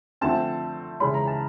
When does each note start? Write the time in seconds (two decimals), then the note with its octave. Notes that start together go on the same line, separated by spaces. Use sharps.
0.21 D3 F3 A3 C4 A5
1.00 C#3 E3 G#3 C#4 B5
1.14 A#5
1.27 A5